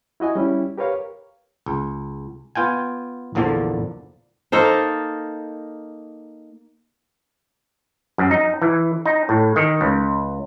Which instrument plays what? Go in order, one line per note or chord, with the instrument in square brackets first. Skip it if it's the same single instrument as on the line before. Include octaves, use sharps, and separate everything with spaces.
[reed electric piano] E4 F#4 D#5 G#5
G3 C#4 E4 G4
G4 A#4 B4 C#5 F5
[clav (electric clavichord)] C#2
B3 F4 G5 G#5
A#1 E2 D3 F3 A#3 D5
[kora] A#3 D#4 A4 C5
[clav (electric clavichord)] F#2
D#4
E3
D#4
A2
D#3
C#2